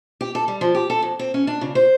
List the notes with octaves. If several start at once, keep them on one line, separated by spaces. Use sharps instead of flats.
G4
A4
G3
F3
G4
A4
F2
C4
C#4
D4
C#3
C5